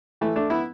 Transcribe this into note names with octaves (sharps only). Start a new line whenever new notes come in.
E3 A3
A3 D4
B3 E4